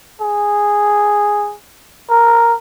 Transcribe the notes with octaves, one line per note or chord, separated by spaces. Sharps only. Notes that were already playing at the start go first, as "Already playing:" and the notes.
G#4
A#4